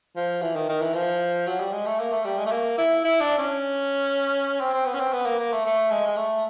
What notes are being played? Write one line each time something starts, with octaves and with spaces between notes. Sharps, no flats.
F3
E3
D#3
D#3
E3
F3
F#3
G3
G#3
A3
A#3
A3
G3
G#3
A3
A#3
E4
E4
D4
C#4
C4
C4
B3
C#4
C4
B3
A#3
A#3
A3
A3
G#3
G#3
A3